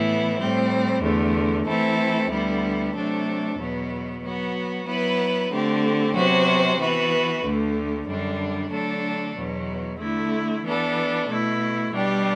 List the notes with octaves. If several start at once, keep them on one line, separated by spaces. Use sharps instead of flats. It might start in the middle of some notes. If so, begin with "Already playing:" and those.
Already playing: A2 E3 B3 E4
A2 G3 C4
E2 D3 A3
E3 A3 C4 E4 A4
D2 D3 G3 B3 E4
C3 F#3 A3 D4 A4
E2 B2 F#3 B3
F#3 B3 F#4
F#3 B3 E4 B4
D3 A3 C4 G4
C3 F#3 B3 F#4 C5
E3 B3 F#4 B4
D2 D3 A3
F#2 D3 G3 D4
D3 F#3 A3 D4 A4
E2 B2 F#3
D3 A3 E4
E3 B3 D4 A4
B2 A3 E4
B2 G3 D4 G4